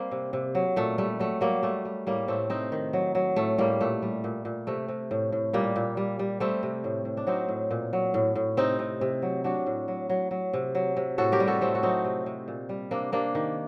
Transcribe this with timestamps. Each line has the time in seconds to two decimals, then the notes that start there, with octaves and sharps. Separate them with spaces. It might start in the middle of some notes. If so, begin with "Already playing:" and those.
Already playing: G3 A#3 C4
0.11 C3
0.33 C3
0.55 F#3
0.76 A#2 A3
0.98 G3 A3
1.19 F#3 A3
1.41 F#3 G3 A#3
1.63 G3 A3
1.85 G3
2.07 A2 G3 A#3
2.28 A2 A3 C4
2.50 C3 C4 D#4
2.72 D#3
2.93 F#3
3.15 F#3
3.36 A2 A3
3.58 A2 G3 A#3
3.81 A#2 A3
4.02 G3
4.24 A#2
4.45 A#2
4.67 C3 A3
4.88 C3
5.11 A2
5.32 A2
5.53 A#2 G3 A#3
5.76 A#2
5.97 G3
6.19 G3
6.40 G3 A3 C4
6.63 C3
6.84 A2
7.05 A2
7.17 D4
7.27 F#3 C4 D#4
7.49 A2
7.71 A#2
7.93 F#3
8.14 A2
8.36 A2
8.57 C3 C4 D#4
8.79 C3
9.01 C3
9.22 F#3
9.44 F#3 D4 F#4
9.66 A2
9.88 F#3
10.09 F#3
10.31 F#3
10.53 C3
10.75 F#3
10.97 C3
11.18 A2 F#4 A4
11.32 G4 A#4
11.40 G3
11.47 F#4 A4
11.61 A2 A3 C4
11.75 F#4
11.83 F#3 C4 D#4
12.05 C3
12.26 C3
12.48 A#2
12.69 G3
12.91 C3 A#3 D4
13.12 C3 A#3 D4
13.35 D#3